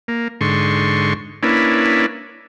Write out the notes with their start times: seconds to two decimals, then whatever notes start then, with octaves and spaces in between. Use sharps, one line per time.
0.08 A#3
0.41 G#2 D3 C6 C#6
1.43 A#3 C#4 D4 E4 B4